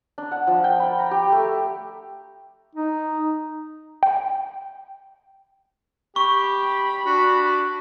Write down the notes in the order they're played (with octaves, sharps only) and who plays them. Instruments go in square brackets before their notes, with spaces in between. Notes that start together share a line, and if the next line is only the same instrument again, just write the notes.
[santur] D4
F#5
F3
G5
B5
A#5
G4
A3
[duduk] D#4
[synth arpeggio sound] G5
[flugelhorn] G4 [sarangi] B5 [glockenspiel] C#6
[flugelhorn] D4 [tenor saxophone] F#4